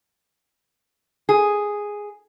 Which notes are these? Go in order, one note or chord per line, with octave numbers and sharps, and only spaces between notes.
G#4